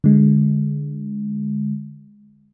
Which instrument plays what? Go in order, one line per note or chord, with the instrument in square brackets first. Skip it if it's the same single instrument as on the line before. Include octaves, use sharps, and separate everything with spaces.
[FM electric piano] D3 G#3